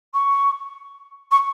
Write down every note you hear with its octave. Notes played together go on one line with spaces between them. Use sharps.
C#6
C#6